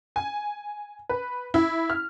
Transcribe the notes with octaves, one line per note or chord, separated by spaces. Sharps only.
G#5
B4
E4
F6